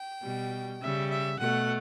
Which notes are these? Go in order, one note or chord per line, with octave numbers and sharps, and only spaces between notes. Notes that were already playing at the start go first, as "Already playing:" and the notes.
Already playing: G5
B2 G3
C#3 G3 E5
E5
B2 A3 F#5